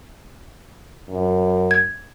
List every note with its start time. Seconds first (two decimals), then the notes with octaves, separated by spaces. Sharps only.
1.09 F#2
1.71 G#6